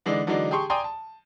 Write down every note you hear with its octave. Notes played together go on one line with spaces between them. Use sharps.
D3 E3 G#3 D4 D#4
D3 E3 F#3 G#3 D4 D#4
G4 G#4 A5 C6 C#6
D5 G5 G#5 A#5 C6 D#6
A5